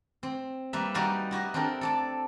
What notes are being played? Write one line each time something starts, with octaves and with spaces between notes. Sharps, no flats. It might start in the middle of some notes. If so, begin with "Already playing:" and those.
C4
G3 A#3 B4 E5
G3 D#4 F#4 B4 D5 F5
E4 F#4 G4 D#5
C4 D4 G4 A4 A#4
A4 D5 A5